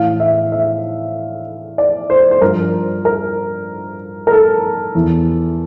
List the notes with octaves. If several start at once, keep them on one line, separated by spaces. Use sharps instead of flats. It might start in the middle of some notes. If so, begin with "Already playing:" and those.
Already playing: A2 E3 F5
E5
E5
D5
C5
C5
G2 F3 A#4
A#4
A#4
A4
E2 E3